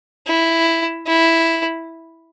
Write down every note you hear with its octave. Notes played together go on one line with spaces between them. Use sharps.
E4
E4